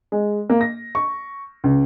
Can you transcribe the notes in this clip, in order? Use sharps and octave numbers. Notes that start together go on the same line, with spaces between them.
G#3
A#3
A#6
C#6
C#2